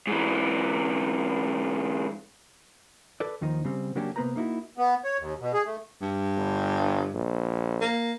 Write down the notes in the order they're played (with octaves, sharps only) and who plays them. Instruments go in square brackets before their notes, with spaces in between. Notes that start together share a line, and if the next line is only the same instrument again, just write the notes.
[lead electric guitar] G#2 E3
[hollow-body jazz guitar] A4 B4 D5
D#2 D#3 F3 D#4
C#3 G3 C4
C#3 F#3 A#3 C#4 D4 G4
C3 A#3 B3 B4 C5 A#5
A#3 D#4 E4 F#4
[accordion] B3
C#5
D#2
B2
G#4
A3
[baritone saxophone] G2
[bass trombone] G1
A#1
[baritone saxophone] A#3